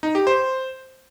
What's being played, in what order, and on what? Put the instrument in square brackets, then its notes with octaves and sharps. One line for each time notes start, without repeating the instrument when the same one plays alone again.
[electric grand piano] D#4
G4
C5